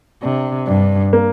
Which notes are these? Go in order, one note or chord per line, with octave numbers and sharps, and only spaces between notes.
C3 D4
G2 D4
A#3